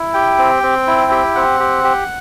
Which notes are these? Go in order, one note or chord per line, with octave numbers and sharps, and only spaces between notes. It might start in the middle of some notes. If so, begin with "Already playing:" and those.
Already playing: E4
G4 G5
C4
C4
E4
G4
C4 F#5
G4
G4